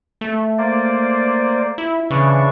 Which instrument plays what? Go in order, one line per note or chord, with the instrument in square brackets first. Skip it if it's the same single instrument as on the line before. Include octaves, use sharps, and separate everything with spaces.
[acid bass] A3
[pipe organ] A#3 C5 D5
[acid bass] E4
[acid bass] C#3 [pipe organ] E3 D4 C#6